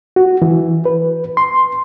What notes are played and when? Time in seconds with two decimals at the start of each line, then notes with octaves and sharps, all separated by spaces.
0.16 F#4
0.42 E3
0.85 B4
1.37 C6